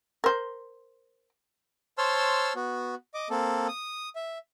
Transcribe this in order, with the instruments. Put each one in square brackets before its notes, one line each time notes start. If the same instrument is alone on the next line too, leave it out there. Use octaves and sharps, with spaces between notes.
[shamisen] A#4 C5
[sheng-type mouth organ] C5 C#5 A5 C6 E6 F6
B3 F#4
D#5 D6
A#3 C4 A4
D#6
E5